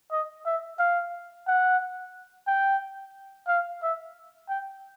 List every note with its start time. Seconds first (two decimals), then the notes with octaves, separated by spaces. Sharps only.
0.12 D#5
0.46 E5
0.79 F5
1.47 F#5
2.47 G5
3.47 F5
3.82 E5
4.49 G5